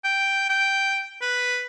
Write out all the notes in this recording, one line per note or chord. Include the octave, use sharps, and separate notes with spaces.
G5
G5
B4